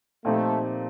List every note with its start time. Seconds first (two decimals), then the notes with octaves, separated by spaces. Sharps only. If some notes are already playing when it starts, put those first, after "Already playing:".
0.25 A#2 F3 A3 C4 D#4 G4